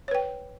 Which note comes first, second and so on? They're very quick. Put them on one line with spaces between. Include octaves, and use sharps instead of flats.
C#5 B4 G5